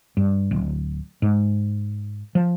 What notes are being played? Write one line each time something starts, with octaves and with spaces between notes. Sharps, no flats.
G2
D1
G#2
F3